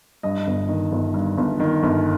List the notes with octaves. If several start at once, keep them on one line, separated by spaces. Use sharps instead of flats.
G2 D#5
G1
D#3
G1
G2
G1
D#3
G1